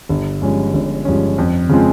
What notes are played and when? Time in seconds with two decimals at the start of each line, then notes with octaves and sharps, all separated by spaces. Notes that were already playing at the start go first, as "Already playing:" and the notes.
0.09 G1
0.42 G2 F3 G#3 C#4
0.73 G1
1.05 G2 F3 G#3 C#4
1.38 F2
1.69 C#3 F3 G#3 C4